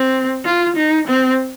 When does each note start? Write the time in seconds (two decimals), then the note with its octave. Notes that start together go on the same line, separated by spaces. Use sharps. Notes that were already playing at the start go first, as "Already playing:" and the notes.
Already playing: C4
0.45 F4
0.76 D#4
1.07 C4